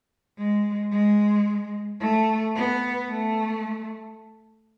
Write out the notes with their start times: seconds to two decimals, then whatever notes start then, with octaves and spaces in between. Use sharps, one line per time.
0.38 G#3
0.92 G#3
2.00 A3
2.55 B3
3.09 A3